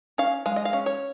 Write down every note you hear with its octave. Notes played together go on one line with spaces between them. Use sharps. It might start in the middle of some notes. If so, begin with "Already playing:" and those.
C#4 F5
G#3 F5
D#5
F5
C#4
C#5